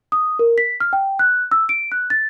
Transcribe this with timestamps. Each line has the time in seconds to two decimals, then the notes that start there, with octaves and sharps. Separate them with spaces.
0.12 D#6
0.39 A#4
0.58 B6
0.80 F6
0.93 G5
1.19 F#6
1.52 E6
1.69 D7
1.92 F#6
2.10 A6